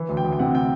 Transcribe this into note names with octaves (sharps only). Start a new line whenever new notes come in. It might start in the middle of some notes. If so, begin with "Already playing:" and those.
Already playing: E3
D2
G5
D2
G5
C3 F#5
G5